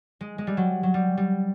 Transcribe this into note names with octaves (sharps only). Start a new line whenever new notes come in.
G#3
G#3
G3
F#3
F#3
G3
G3